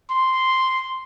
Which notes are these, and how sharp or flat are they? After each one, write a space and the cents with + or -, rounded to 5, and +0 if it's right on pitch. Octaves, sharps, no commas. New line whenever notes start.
C6 -5